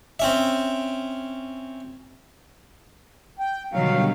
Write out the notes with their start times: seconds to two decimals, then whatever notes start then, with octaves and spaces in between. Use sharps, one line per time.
0.20 C4 C#4 E5
3.39 G5
3.73 B2 D3 D#3 F#3 G3 F5